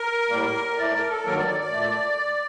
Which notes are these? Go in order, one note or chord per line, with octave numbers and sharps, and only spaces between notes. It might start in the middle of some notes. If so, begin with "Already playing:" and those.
Already playing: A#4
A2 G3 A#3
A2 A3 D5
A#4
A4
G2 D#3 F#3 A#3 A#4
D5
D5
D5
A#2 A3